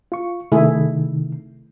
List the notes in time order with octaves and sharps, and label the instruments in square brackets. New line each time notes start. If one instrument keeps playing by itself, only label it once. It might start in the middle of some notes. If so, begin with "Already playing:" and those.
[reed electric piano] F4 C#6
[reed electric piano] C3 D#3 [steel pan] A3 E4 G#4